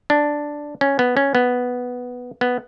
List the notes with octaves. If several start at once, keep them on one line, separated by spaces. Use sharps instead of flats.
D4
C#4
B3
C#4
B3
B3